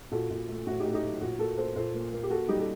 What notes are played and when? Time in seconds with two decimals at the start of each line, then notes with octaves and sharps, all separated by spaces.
0.12 A#2 F#4 A4
0.30 A#2
0.48 A3
0.67 A2 F#4
0.80 D#4 G4
0.85 A3
0.94 D#4 G4
1.03 F#3
1.21 A#2 F#4
1.39 A#3 F#4 A4
1.58 A#3 A4 C5
1.76 A#2 A4 C5
1.94 A#3
2.13 A#3
2.23 G4
2.30 A#3 F#4 A4
2.48 G3 D#4 G4
2.59 A4